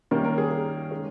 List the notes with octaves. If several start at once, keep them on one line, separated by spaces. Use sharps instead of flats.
D#3 G3 A#3 C#4 A#4
A#4
G#4
G#4
C#3 G#3 C#4